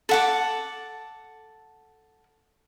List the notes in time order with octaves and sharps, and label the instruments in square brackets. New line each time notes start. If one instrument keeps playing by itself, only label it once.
[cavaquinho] A4 F#5 D6